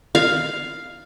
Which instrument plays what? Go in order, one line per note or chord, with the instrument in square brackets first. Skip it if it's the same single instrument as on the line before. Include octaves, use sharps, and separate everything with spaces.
[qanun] F5